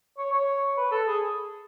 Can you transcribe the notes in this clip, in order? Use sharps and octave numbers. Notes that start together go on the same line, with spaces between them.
C#5
C#5
B4
A4
G#4